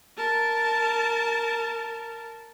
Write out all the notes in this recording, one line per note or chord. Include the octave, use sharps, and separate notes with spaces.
A#4 A5